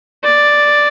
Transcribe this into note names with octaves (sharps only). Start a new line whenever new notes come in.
D5